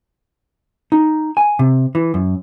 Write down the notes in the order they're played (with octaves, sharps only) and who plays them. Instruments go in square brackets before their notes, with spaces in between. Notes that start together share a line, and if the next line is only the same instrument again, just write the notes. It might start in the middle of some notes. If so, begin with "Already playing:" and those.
[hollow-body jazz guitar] D#4
G#5
C3
E3
F#2